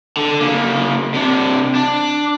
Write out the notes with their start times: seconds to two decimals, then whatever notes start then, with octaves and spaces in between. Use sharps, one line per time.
0.17 D3
0.41 C#3 A#3
1.14 C3 D4
1.75 D4